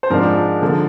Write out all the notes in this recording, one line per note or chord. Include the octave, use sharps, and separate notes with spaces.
C5
G#2 F3 G#3 D4 A#4
D3 F3 A#3